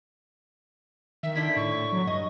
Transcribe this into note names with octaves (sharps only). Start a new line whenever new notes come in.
D#3 E5
D3 D4 E4 B6
A2 C#6
F#3
G2 D#5